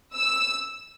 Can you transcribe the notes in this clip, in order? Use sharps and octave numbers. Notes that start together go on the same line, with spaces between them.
E6